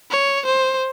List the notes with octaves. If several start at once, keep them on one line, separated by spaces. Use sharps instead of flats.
C#5
C5